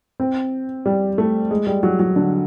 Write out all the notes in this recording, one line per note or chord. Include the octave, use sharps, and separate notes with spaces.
C4
G3
A3
G#3
G3
F#3
F#3
D3